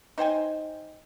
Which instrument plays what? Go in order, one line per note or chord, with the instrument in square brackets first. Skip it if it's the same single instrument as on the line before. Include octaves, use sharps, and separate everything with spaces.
[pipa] D#4 C5 G5 G#5